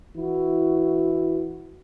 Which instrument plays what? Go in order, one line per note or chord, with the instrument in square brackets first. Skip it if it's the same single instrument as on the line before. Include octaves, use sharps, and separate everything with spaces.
[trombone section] E3 E4 F#4